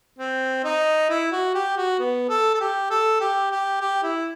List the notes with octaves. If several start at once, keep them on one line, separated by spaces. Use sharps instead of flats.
C4
D#4
E4
F#4
G4
F#4
B3
A4
A4
G4
A4
G4
G4
G4
E4